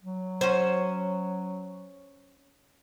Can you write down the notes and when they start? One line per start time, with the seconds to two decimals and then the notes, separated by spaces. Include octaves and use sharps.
0.03 F#3
0.41 C#4 F#4 C5